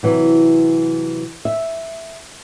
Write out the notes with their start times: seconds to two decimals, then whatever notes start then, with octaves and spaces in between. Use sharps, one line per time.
0.03 C3 E3 F#3
1.45 E5